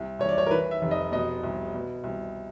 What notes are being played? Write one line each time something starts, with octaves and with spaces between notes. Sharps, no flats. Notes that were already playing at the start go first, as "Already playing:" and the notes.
Already playing: C2
C2 C#5
D5
C#5
A#4
E3 B4
E5
F1
D#5
B2 D#5
C2
B2
C2